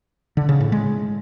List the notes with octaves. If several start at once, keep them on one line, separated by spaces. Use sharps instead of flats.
D3
C#3
A2
G#3